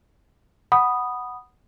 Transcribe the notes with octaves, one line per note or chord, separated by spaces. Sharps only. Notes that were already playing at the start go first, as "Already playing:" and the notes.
F#5 B5 D#6